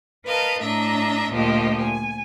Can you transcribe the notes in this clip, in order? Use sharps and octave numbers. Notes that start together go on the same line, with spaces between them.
A#4 B4 D#5 F5 A5
A2 D4 D#5 E5 A#5
D2 A#2 F3 G4 D#5
G#5